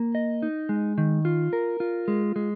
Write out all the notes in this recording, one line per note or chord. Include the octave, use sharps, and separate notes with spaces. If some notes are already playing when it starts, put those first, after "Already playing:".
Already playing: A#3
D#5
D#4
G#3
D#3
F4
A#4
F4
G#3
G#3